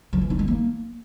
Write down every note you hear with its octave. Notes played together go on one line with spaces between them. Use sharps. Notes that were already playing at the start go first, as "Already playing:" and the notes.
F3
E3
D#4
G#3
A#3